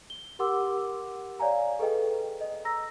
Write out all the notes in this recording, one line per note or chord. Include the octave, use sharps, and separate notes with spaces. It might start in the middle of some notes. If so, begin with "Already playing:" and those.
G7
G4 A#4 F#5 C6 D6 E6
C#5 D5 F5 G#5 A#5
G#4 A4 B4 D#5 G5
D#5
A#5 E6 A#6